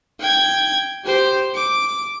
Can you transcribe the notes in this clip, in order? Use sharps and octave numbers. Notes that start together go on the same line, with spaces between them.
G5 G#6
G4 C5
D6